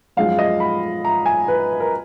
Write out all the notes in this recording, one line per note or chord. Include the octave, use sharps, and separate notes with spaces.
F#2 F3 G#3 F5
D#5
B5
A#5
G#5
B4
A#4